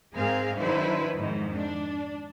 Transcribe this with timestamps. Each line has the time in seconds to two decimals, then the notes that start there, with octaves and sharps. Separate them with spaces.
0.14 G#2 C4 G#4 A#4 F5
0.58 D#3 F#3 D4 E4 B4 C5
1.16 F2 G#2 D#3
1.55 D4